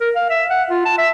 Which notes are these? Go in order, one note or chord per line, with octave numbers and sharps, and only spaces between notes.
A#4
F5
E5
F#5
F4
A5
E5